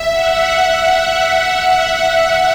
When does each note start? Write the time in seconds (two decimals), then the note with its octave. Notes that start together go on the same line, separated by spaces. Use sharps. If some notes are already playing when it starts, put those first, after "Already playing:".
Already playing: E5
0.10 F#5
0.55 E5